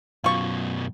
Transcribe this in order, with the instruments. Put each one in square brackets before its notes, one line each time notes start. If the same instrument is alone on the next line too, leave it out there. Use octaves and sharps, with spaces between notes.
[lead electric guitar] F#2 B2 [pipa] F4 C#6